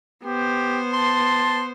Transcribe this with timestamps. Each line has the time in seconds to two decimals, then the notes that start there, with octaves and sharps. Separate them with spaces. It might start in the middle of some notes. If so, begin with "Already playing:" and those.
0.25 B3 G4 C5
0.93 A5 C6